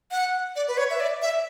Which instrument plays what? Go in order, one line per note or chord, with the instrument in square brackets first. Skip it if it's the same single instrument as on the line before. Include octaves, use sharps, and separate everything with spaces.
[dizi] F#5
D5
B4
C#5
E5
D5
E5